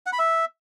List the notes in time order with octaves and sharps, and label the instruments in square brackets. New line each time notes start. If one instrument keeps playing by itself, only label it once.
[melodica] F#5
B5
E5